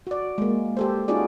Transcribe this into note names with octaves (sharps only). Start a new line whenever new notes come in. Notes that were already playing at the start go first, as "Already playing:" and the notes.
F#4 D5
G#3 A#3
G4 A4 C5
C#4 D#4 F4 F#4 G#4 D5